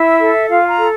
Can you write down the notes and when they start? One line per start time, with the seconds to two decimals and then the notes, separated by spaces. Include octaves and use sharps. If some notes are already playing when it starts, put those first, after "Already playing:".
Already playing: E4 E5
0.20 A4
0.48 F4 F5
0.68 A#5
0.77 A4